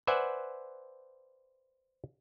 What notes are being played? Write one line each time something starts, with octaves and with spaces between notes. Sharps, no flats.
B4 C5 D5 E5 F#5 G#5